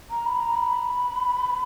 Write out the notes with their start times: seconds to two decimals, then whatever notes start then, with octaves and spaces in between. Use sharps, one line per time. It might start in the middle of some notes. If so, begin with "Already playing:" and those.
0.11 A#5
0.26 B5
0.41 A#5
0.55 B5